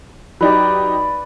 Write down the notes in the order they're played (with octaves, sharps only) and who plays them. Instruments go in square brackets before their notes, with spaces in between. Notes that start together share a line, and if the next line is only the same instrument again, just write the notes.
[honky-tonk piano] F#3 D#4 G4 [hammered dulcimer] B4 D5